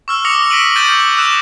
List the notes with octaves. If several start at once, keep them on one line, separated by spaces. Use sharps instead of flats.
C#6 E6 F6
D6 D#6 A#6 C#7 F7
A#6 B6 D7 D#7 F#7
D#6 F6 G6 A6 D#7 F#7
D6 E6 F#6 E7